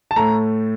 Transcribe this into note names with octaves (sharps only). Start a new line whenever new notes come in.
A5
A2 A3 A#5